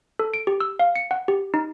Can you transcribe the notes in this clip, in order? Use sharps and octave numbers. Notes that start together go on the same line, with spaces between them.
A4
D7
G4
E6
F5
C#7
F#5
G4
D#4